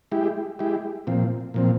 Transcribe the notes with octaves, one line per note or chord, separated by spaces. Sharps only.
G#3 E4 G4
G#3 E4 G4
A#2 F3 C4
A#2 F3 C4